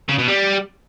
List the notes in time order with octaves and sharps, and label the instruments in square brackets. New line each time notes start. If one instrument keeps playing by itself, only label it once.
[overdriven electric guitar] C#3
B2
G3